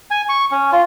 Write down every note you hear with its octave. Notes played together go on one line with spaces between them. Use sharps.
G#5
C#6
C#4
F4